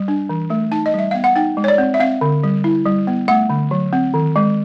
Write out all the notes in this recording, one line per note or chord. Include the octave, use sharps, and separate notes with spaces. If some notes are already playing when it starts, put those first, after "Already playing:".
Already playing: G3
D4
E3
A3
D#4 A5
D#5
G3 E5
B3 F5
F#5
D#4 G5
G#3
C#5
D5
C4
E5
C4 F5
D3
G3
E4
G3
B3
A3 F#5
D3
F#3
C4
D#3
G#3